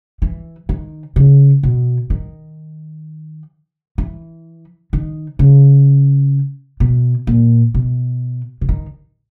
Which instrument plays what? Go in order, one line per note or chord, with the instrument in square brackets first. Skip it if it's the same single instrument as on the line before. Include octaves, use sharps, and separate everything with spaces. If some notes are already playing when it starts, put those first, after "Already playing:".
[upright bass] E3
D#3
C#3
B2
D#3
E3
D#3
C#3
B2
A#2
B2
C#3
D#3